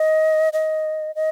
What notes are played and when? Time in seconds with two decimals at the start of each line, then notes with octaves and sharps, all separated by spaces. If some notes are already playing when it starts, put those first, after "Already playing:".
Already playing: D#5
0.53 D#5
1.15 D#5